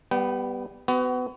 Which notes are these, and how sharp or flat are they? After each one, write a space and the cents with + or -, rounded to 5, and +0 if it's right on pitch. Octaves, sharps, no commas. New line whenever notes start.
G3 +5 B3 +0 G5 -35
B3 +30 F#4 +25